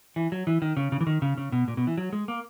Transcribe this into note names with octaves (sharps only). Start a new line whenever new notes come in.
E3
F#3
E3
D#3
C#3
C#3
E3
D#3
C#3
C#3
B2
A#2
B2
E3
F#3
G#3
A#3